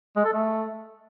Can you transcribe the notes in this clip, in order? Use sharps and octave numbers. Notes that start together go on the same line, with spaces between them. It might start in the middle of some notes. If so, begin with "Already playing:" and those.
G#3
A4
A3